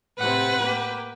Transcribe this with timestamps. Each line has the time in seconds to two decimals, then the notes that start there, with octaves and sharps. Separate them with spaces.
0.19 A2 C3 C4 B4 F#5
0.63 A#3 G4